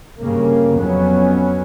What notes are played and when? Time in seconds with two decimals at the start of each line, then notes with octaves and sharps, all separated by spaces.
0.20 G2 C#3 A#3
0.76 F2 F#3 B3 C#4